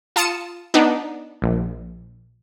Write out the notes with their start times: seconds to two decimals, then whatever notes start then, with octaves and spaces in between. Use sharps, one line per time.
0.16 F4 A5 D#6 C#7 E7
0.74 B3 D4 D#4
1.42 A#1